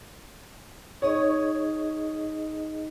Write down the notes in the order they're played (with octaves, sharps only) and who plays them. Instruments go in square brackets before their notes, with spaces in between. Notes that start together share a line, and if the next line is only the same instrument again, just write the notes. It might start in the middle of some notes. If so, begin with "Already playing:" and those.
[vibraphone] D#4 G#4 D#5 [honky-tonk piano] C#5